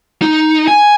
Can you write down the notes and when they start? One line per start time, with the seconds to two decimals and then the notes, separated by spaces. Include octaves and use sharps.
0.22 D#4
0.68 G#5